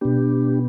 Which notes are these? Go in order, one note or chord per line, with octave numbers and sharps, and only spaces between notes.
B2 B3 D4 G4